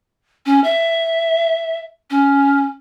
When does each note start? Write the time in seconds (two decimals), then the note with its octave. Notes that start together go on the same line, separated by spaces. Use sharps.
0.46 C#4
0.64 E5
2.10 C#4